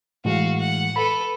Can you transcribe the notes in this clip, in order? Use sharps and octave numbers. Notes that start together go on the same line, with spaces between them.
A2 E3 G#3 F#4 F5
F#5
A4 B4 B5